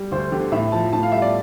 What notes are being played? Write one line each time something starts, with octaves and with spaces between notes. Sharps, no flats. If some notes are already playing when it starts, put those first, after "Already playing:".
Already playing: G3
D2 C5
D3 G4
A2 E5
F3 A5
A2 A5
F5
G3 E5
D5